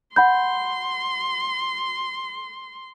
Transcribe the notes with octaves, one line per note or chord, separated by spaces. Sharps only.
F#5 B5 C6 G6